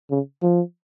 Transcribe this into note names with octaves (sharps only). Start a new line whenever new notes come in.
C#3
F3